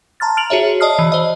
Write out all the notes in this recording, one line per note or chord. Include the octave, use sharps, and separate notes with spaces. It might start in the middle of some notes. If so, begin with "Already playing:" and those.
A5 A#5 C6 F6 A6
F6 D7 F7 F#7
F#4 G#4 C#5 E5
D5 D#5 A5 D#6 F6 C7
E3
C5 D#5